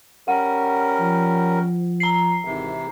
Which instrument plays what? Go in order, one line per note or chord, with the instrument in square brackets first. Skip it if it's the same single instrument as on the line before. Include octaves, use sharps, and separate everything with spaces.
[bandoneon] G3 C#4 A#4 [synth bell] F#5
[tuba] F3
[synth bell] A#5 C7
[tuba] G#1 [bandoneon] C3 E3